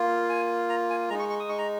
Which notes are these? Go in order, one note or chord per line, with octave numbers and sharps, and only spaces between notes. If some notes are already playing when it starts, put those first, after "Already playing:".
Already playing: A#3 F4
G#5
A#5
G#5
G#3 D#4 A#5
C#6
C#6
D#6
C#6
A#5